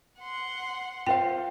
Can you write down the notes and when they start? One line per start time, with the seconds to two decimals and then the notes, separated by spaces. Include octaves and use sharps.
0.20 F#5 C6
1.07 F4 C5 F5 G5